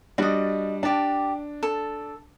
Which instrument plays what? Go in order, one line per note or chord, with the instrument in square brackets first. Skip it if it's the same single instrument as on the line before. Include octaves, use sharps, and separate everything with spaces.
[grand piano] G3 D4 [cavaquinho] F#4 D#5
[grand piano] D4 [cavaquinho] G4 A5
[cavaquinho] A4